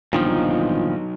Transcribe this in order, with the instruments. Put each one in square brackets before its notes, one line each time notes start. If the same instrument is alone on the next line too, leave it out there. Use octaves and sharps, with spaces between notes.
[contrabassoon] G1 [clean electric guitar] A#2 D#3 F3 [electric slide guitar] F#3 D#4 D#5